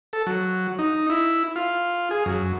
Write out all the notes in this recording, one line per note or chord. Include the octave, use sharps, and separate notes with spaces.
A4
F#3
D#4
E4
F4
G#4
F#2